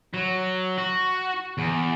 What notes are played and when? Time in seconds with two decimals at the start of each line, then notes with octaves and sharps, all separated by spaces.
0.14 F#3
0.78 F#4
1.58 E2